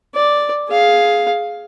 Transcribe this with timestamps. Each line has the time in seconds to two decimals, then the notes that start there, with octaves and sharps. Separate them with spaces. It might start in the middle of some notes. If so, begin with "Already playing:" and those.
0.15 D5
0.69 G#4 F5